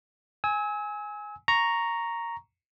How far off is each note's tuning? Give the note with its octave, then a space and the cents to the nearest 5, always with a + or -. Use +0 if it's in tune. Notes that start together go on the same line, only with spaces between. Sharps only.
G#5 +0 E6 -40
A#5 +0 C#6 +0